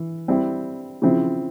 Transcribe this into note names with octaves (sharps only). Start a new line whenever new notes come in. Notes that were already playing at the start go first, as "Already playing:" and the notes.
Already playing: E3
G3 C4 E4
C#3 F3 C4 E4